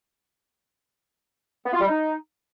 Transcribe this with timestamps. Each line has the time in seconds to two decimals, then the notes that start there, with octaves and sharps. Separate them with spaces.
1.66 B3
1.73 F4
1.81 G3
1.88 D#4